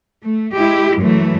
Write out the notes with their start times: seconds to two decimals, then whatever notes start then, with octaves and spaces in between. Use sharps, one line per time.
0.22 A3
0.53 G#3 E4 G4
0.99 F#2 E3 A3